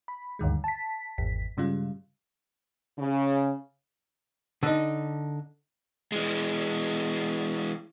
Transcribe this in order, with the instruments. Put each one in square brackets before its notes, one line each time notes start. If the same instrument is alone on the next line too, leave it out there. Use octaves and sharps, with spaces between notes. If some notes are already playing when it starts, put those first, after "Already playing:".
[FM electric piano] B5
D2 G2 D#3 G#3
A5 B6
G#1 E2 B6
G2 C#3 G3 G#3 F4
[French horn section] C#3
[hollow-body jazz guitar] D3 D#4
[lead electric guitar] E3 G#3